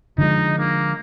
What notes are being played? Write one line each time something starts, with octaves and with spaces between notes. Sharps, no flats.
D3 F3 G#3 D#4
A#3